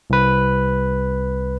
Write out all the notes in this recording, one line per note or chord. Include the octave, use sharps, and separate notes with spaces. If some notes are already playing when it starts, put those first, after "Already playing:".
C2 B4